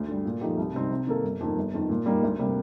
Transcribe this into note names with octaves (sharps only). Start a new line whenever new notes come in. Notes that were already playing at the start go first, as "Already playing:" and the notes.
Already playing: D2
D3 G3
A#2
F3 A3 D#4 G4
C2
C3 G3 C4 D#4
C3
D#3 A#3 D#4 A4
G1
F2 D#3 A#3
G1
F2 D#3
A#2
G3 A#3 D#4
D2
C3 G3 A#3